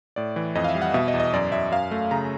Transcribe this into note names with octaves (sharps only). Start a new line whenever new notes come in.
A2 D5
E3
F2 D#5
F5
E5
G3
F#5
B2 E5
D#5
E2
D#5
F#2 D5
F#2 E5
F#2 F5
A3
C#3 A#5